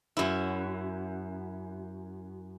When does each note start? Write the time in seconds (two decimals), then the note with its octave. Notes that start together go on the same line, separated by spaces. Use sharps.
0.17 F#2 E4